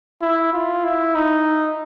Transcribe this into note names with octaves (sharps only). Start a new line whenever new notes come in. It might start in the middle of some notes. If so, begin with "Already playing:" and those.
E4
F4
E4
D#4